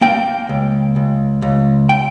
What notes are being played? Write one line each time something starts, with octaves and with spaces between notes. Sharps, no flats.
A#3 G5
C#2
C#2
C#2
G5